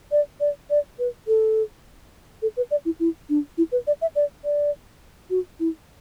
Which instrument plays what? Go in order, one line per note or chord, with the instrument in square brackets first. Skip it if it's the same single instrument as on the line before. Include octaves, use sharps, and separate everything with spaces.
[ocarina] D5
D5
D5
B4
A4
A4
B4
D5
E4
E4
D4
E4
B4
D5
E5
D5
D5
F#4
E4